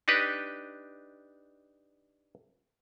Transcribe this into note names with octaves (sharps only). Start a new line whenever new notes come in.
D4 D#4 G4 B4